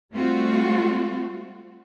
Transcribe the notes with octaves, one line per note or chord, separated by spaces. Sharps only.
G3 A3 C4 F4 F#4